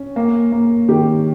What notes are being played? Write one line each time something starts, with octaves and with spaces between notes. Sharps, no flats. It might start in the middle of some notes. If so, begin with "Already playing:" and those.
Already playing: C#4
A#3
A#3
D#3 G4